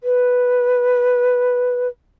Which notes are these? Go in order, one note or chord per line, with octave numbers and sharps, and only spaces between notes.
B4